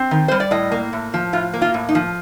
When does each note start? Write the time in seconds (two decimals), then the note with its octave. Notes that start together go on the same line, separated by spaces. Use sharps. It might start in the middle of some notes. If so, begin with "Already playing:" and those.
Already playing: C4
0.11 D#3
0.28 G3 C5
0.40 D5
0.51 A2 D#5
0.72 A#3
0.93 A2
1.14 F3
1.33 A2 F4
1.53 A#3
1.62 F4
1.74 A2
1.89 D#4
1.95 F3